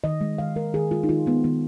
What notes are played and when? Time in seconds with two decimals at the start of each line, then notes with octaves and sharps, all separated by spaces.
0.04 D#3 D#5
0.21 G#3
0.38 D#3 F5
0.56 G#3 A#4
0.74 D#3 G#4
0.91 G#3 F4
1.03 D#4
1.09 D#3 F4
1.26 G#3 B3
1.44 D#3 B3